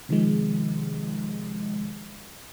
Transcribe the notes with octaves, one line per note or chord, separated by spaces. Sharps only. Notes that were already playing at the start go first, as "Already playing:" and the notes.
C3 D#3 F3 G#3